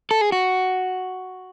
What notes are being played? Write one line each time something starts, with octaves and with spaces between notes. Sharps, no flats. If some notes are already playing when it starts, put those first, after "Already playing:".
A4
G#4
F#4